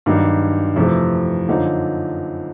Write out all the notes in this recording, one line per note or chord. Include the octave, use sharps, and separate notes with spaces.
G2 D#3 F#3 A#3 D#4
F2 C3 E3 A3
F#2 D3 F3 A#3 D#4